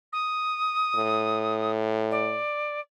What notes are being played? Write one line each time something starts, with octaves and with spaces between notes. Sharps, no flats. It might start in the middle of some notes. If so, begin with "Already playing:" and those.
D#6
A2
D5